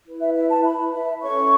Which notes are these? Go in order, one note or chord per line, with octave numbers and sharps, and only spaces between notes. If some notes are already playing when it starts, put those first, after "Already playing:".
E4 B4
E5
E5
A5
B5
E5
C#4 A4 C#5 C#6